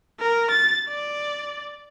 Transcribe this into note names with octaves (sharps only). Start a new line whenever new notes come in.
A#4
A6
D5